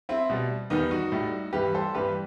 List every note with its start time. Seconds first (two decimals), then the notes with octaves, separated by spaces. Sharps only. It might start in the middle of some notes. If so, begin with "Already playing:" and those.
0.09 C4 E4
0.30 B2 G3
0.70 E2 D#3 G3 B3 D#4
0.91 D#4 F#4
1.12 A2 G3
1.53 G2 E3 G3 G4 B4
1.74 A4 C5
1.94 G2 E3 G3 G4 B4